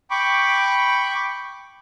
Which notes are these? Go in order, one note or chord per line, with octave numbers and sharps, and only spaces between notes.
G5 B5 C#6 D6